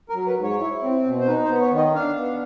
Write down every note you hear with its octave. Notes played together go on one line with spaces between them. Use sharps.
A#4
F#3
B4
G#2
C#5
E4
C4
B2
C5
D#4 B4
C5
B3
C#5
D#3
D#5
D4 F5
B3